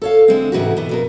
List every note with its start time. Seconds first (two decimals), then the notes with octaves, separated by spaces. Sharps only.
0.02 A4 C#5 F5
0.28 D3 G#3 C4
0.52 D2 G#2 C3 E3 F#4
0.77 B2 E3
0.89 F2 B2 A#4